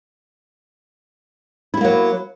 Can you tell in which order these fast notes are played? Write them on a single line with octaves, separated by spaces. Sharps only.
E4 G3 A#3 F#3